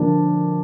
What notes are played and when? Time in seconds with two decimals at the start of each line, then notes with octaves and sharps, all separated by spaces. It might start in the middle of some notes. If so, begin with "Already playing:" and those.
Already playing: D3 F3 A#3 D4